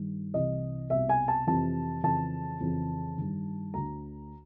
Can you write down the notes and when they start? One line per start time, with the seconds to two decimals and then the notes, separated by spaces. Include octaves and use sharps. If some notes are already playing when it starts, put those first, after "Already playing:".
Already playing: G2 D#3
0.34 C2 C3 E3 D#5
0.90 C2 B2 E5
1.09 G#5
1.28 A5
1.47 F2 C3 E3 A5
2.03 F2 C#3 E3 A5
2.60 F2 C#3 E3
3.18 G2 D#3
3.74 D2 D3 A#5